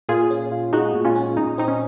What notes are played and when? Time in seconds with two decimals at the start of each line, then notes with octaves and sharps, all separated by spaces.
0.09 A#2 F4 G#4
0.30 C#4
0.52 F4
0.73 G#3 D#4 F#4
0.94 A#2
1.05 C#4 F4
1.16 C#4
1.37 A#2 D#4
1.58 C4 D#4
1.68 C#4